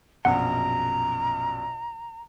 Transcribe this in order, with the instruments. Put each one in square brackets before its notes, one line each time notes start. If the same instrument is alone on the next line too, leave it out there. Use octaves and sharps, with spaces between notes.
[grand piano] A#1 F#2 B2 [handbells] F#5 [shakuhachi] A#5